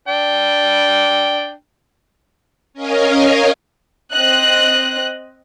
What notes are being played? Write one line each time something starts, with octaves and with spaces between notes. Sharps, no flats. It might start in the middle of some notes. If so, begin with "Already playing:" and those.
D4 G5
C#4 A#4 C#5 D#5 F5 G#5
C4 D#5 F#6